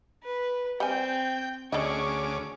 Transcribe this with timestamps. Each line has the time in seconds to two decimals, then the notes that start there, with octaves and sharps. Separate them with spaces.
0.24 B4
0.80 G3 C4 G5 G#5
1.72 D2 C#4 D4 G#4 A4 D#5 C#6 D6